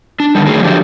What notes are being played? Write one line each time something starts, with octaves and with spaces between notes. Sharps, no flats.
D4
D3 D#3 G3
D#3 F#3 A3 G#4
F3 F#3 A3 D4 G4